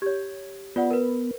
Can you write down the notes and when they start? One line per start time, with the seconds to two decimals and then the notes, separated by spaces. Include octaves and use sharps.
0.02 G4 C#5 G#6
0.76 B3 F4 D5 F#5
0.91 A#4 B4